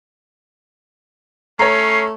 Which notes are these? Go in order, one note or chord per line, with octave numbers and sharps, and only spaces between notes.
A3 C#4 C#5 A#5 C7